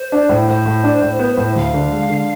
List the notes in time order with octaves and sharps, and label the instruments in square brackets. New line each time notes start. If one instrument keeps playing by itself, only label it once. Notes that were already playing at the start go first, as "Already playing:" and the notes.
Already playing: [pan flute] C5
[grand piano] D4
A2
[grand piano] A2 [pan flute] C5
[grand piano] A2
D4
A2
B3
A2
[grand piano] D2 [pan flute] F5
[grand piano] D3
G#3
D3